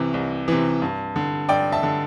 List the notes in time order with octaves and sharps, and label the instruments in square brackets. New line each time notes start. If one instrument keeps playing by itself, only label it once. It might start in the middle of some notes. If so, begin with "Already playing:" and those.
Already playing: [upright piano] C2 C3 E3
C2
C3 E3
G2
D3
G2 D5 G5
E5 A5
D3